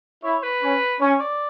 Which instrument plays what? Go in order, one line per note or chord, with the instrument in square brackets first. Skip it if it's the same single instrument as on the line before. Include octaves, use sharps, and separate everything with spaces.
[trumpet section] E4 [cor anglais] C#5
[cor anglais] B4
[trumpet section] C#4
[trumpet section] C#4 [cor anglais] C#5
[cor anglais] D5